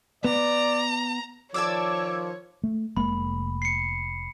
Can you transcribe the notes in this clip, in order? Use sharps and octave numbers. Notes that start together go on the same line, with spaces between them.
B3 D5 A#5
D#3 F3 C#5 D5 A5 D6 E6 G#6
A3
F1 G#3 A#3 B5
C7 C#7